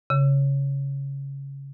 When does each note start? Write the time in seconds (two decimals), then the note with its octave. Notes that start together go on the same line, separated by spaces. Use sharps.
0.10 C#3